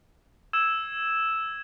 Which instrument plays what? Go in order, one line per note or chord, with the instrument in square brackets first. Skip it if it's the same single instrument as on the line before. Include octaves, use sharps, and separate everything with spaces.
[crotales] E6 G#6 E7